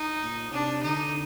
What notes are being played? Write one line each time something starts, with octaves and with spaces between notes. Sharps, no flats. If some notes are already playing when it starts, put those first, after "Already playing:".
Already playing: D#4
A#2
C3 D4
D3 D#4